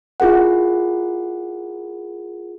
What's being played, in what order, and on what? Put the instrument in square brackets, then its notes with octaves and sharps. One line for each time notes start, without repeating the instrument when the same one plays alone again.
[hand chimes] E4 F4 G#4 A#4 F#5